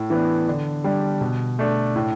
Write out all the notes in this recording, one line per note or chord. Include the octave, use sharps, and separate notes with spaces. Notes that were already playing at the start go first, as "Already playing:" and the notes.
Already playing: A2
E3 B3 D4
D3
G3 D4
B2
A3 D4
A2